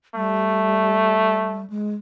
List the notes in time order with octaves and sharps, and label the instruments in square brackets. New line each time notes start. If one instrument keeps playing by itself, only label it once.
[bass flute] G3 [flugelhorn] A3
[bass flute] G#3